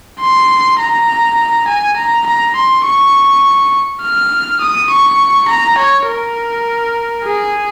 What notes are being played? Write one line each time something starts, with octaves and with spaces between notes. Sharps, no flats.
C6
A#5
G#5
A#5
A#5
C6
C#6
F6
D#6
C#6
A#5
C#5
A#4
G#4